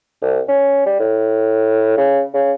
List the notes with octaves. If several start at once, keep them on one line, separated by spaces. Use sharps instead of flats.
C2
C#4
G3
A2
C#3
C#3